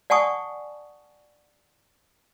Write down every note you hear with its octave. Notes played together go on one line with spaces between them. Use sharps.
D5 F#5 G#5 A5 C#6 D#6